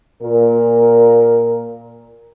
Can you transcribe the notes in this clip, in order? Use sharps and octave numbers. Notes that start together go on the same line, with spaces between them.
A#2 A#4